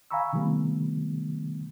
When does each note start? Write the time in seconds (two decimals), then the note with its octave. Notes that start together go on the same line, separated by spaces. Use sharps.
0.11 F5 G#5 A#5 B5 C#6 E6
0.33 C3 D#3 F3 G3 A3 B3